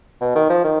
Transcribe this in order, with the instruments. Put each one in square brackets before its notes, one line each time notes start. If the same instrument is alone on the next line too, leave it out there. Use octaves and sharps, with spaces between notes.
[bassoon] B2
D#3
F3
D#3